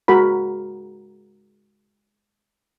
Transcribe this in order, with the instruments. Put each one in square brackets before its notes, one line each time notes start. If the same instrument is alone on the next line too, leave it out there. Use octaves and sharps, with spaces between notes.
[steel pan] G#3 F#4 A#4 B5